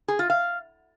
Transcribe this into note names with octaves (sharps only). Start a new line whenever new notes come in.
G#4
F4
F5